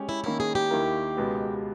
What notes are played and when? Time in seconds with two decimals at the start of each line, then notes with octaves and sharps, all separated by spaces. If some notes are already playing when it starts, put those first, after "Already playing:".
Already playing: G#3 C#4 G4 C#5
0.09 E4
0.24 D#3 A#3 C#4 E4
0.40 G#4
0.55 G4
0.70 D#2 D#3 A#3 E4 A#4
1.17 C#2 B2 G#3 B3